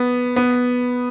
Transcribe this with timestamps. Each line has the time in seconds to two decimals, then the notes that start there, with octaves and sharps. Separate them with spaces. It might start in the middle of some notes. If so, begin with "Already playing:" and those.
Already playing: B3
0.36 B3